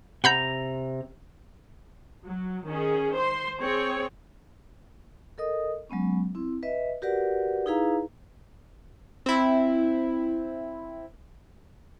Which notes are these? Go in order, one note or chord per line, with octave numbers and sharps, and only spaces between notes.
C3 F#5 A#5 B5 G6
F#3
D#3 C#4 G#4
C5 C6
C4 G#4 C#5
A4 A#4 D#5 D#6
F#3 G#3 B3 C#4
C4 E4
B4 D#5 E5
F#4 G4 A#4 B4 D5 F#5
D#4 E4 G#4 B4 F5 A#5
C4 E4